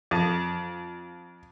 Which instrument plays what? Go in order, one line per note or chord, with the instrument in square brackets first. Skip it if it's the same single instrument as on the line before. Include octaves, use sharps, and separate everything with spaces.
[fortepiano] F2